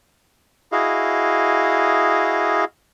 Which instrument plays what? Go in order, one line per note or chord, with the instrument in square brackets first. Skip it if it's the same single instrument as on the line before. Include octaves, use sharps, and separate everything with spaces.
[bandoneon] E4 F#4 G#4 D#5 F5